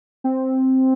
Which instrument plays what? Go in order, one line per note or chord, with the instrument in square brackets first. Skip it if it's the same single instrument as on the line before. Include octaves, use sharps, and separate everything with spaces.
[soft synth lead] C4